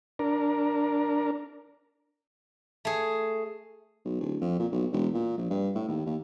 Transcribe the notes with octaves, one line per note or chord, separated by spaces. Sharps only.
D4 A#4
A3 G#4
B1
D1
F2
A#2
B1
E1
A#2
A#1
G2
A2
D#2
D#2